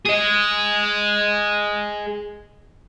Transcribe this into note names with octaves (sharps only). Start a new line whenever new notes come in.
G#4 D#5